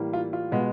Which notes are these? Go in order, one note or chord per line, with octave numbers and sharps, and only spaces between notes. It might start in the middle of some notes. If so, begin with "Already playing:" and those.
Already playing: A2 E3 G3 A#3
F4
F4
B2 G#3 B3